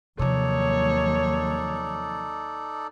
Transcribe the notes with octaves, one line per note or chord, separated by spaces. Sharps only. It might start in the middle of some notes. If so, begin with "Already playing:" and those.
D#2 C3 F3 F#3 D#4 A4 C#5 D5